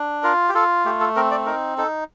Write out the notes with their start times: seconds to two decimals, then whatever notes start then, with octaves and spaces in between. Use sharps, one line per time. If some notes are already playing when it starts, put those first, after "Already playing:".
Already playing: D4
0.23 F4 A#4
0.49 G4
0.55 F4 A4
0.85 A3 G4
1.00 A4
1.16 C4 A#4
1.31 D5
1.46 D#4 A#4
1.78 D#4 A4